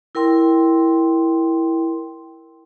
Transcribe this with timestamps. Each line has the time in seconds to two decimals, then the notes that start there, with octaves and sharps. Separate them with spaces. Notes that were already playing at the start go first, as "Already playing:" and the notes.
0.15 E4 A#4 G5 C6